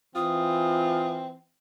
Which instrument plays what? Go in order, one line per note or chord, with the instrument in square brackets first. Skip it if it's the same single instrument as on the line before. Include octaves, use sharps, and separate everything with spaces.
[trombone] E3 [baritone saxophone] C4 [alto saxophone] F4 [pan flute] D#6